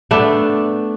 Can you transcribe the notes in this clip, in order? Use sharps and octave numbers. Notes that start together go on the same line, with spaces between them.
A3 B3 D4